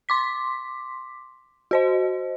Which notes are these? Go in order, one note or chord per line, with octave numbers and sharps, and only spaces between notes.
C6 D6 B6
F#4 C5 D#5